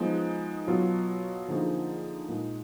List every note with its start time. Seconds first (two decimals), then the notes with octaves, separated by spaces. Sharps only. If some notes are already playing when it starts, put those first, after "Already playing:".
Already playing: F3 G#3 B3 D#4
0.67 B2 F#3 B3 F4
1.48 D3 F3 A#3 D#4 G#4
2.28 A#2 G#3 D#4